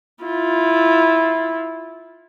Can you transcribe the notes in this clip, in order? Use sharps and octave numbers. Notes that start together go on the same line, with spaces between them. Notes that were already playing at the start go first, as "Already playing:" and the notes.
E4 F4